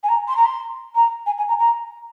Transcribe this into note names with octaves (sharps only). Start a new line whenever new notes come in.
G#5
A#5
C6
A#5
C6
A#5
G#5
G#5
A#5
A#5